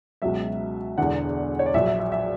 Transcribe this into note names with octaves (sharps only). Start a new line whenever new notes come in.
C#2 B2 F#3 E5
E1 E2 D3 F#5
C#5
D5
A#1 A#2 F#3 E5
E5
E5
E5